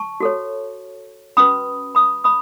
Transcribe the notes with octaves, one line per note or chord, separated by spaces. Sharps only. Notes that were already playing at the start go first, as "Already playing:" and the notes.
Already playing: A5 C#6
F#4 A4 C#5
C#4 F#4 B4 B5 D#6
B5 D#6
B5 D#6